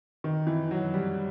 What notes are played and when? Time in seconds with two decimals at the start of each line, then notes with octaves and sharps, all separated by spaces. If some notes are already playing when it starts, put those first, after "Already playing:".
0.24 D#3
0.47 E3
0.71 F#3
0.94 G3